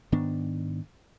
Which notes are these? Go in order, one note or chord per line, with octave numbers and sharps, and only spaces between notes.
G#2 D#3 B3 D4